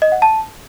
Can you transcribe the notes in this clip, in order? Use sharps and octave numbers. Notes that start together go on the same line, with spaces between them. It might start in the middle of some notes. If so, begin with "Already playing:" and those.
D#5
F#5
A5